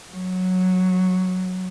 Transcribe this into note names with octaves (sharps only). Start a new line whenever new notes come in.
F#3